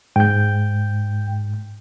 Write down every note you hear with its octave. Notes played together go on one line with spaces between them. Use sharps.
G#2 G5 G6